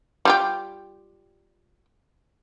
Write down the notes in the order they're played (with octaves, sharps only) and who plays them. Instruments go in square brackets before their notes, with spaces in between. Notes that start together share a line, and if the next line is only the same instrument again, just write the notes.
[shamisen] G3 F4 G4